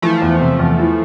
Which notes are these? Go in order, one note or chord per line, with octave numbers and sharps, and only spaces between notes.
E3 F3 A3
E2
C3
E2
E3